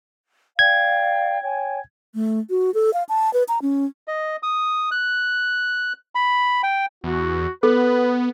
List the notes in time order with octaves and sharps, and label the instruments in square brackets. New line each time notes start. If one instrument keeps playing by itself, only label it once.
[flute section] D5 F5 G5 [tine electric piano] G#6
[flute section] C#5 G5 G#5
[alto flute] A3
F#4
A4
F5
A5
B4
A#5
C#4
[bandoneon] D#5
D#6
F#6
B5
G5
[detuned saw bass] E2 [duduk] F#4
[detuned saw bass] B3 [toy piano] A4 [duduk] B4